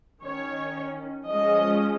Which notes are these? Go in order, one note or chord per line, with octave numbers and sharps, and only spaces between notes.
D#3 C#4 C#5
F3 G#3 C#4 D#5